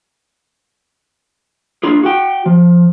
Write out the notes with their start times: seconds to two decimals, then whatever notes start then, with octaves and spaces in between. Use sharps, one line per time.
1.83 D4 F4 G#4
2.03 F#4 G5
2.46 F3